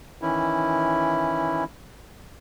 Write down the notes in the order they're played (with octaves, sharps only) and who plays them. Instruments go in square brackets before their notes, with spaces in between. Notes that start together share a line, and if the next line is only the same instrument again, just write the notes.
[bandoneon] D#3 E3 C#4 E4